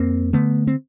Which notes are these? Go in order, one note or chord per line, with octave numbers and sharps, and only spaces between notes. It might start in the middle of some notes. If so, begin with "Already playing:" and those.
Already playing: F2 A#3 C4
D3 A3 B3
C4